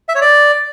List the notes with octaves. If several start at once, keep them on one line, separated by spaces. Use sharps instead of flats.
E5
C#5
D5